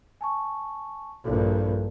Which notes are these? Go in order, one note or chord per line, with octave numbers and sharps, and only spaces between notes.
G#5 A5 C#6
A#1 G2 E4 F#4 A4